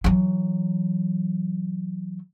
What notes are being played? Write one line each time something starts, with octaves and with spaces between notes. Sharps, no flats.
E3 F#3